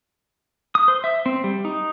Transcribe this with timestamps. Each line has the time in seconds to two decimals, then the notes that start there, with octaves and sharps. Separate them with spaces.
0.75 D#6
0.88 C5
1.04 E5
1.26 C4
1.44 G3
1.65 D#4